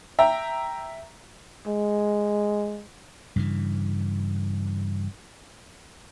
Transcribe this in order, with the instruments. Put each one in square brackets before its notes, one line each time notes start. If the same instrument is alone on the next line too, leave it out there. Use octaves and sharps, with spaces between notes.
[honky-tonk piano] E5 G5 A#5
[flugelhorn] G#3
[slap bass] G2 C#3 E3